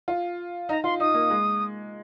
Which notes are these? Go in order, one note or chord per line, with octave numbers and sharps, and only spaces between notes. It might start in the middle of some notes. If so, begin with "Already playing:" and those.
F4
D#4 A#5
F4 C6
D#4 D#6
A#3
G#3